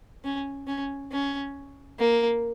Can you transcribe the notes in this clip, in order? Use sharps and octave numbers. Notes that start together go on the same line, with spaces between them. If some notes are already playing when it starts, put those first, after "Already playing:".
C#4
C#4
C#4
A#3